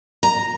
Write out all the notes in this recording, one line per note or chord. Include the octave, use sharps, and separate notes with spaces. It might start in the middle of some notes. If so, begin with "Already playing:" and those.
A#5